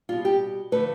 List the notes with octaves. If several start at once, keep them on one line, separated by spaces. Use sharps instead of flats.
B2 G3 F4
G4
D3 F3 A3 B4